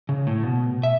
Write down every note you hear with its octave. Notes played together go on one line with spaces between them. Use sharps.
C#3
A2
B2
E5